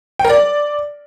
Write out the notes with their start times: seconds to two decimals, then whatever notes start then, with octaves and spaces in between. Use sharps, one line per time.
0.19 G5
0.25 A#4
0.30 D5